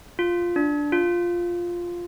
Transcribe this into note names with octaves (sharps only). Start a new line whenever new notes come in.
F4
D4
F4